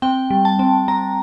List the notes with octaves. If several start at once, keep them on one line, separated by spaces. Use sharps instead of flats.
C4 G5
G3
A5
C4
C4 A#5